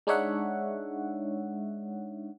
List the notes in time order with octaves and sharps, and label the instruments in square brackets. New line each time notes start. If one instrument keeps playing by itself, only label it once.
[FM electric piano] G#3 D4 D#4 C#5 E5 F#5